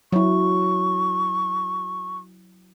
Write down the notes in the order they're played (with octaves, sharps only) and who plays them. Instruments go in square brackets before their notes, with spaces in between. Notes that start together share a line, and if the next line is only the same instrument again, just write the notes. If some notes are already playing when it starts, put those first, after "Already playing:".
[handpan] F#3 E4 [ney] C#6